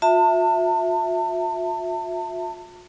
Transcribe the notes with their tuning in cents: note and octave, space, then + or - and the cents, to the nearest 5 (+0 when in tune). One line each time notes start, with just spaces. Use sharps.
F4 +45 E5 +0 A5 +35